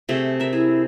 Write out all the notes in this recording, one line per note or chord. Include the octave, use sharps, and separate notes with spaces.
C3 A3 G#4
A#4 E5
E4 G#4